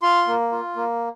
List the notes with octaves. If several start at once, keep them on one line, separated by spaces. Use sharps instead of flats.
F4 C6
A#3
F4
A#3